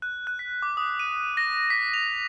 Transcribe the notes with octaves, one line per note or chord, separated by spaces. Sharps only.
F#6
F#6
B6
D6
D#6
D#7
A#6
B6
F7